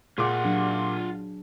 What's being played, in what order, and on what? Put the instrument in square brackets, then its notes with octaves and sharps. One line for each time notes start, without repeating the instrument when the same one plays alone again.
[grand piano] A#2 D6 [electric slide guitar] F4 F5 F#5 [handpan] G#4
[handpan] F#3 D4